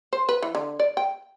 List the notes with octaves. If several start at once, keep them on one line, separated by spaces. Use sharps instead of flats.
C5
B4
E3
D3
D5
G5